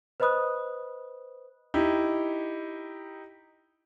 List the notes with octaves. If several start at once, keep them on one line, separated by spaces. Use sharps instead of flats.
B4 C5 D#5 B5 D#6 F#6
D#4 E4 G4